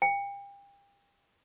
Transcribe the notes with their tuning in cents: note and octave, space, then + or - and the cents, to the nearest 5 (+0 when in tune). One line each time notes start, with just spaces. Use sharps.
G5 +35